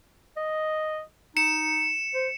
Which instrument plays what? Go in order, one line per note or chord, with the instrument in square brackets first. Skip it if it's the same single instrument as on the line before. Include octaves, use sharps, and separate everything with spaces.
[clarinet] D#5
[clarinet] D#4 [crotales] C#7 E7
[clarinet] C5